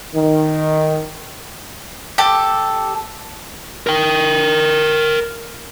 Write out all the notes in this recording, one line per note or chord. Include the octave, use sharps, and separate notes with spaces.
D#3
G4 A4
A#4 G5